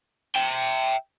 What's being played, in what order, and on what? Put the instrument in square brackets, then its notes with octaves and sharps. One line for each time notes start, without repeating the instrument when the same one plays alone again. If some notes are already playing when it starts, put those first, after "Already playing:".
[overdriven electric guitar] E5 G5